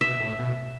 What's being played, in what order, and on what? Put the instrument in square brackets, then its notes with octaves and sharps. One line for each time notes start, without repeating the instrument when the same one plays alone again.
[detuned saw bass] B2 [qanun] E5
[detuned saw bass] A2
B2